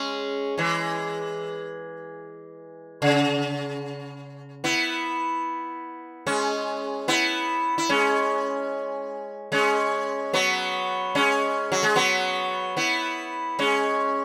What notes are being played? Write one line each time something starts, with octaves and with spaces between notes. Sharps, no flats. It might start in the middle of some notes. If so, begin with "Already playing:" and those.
Already playing: G#3 C#4
E3 G#3
C#3
B3 E4
G#3 C#4
B3 E4
E4
G#3 C#4
G#3 C#4
F#3 B3
G#3 C#4
F#3
G#3
F#3 B3
B3 E4
G#3 C#4